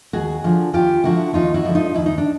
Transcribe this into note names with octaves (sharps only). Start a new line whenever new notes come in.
D#2 F#4 G#4
D3 F3
D#2 F4 G4
D3 F3 E4 F#4
D#2 D#4 F4
E4 F#4
D3 F3
D#4 F4
D#2 E4
D#4
D4